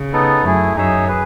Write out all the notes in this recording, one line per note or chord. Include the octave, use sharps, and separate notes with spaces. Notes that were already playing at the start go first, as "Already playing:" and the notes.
Already playing: C#3
B3 D#4 A4
F#2 A3 E4 G#4
F#2 D#4 G#4 C#5 E5
G#4 B4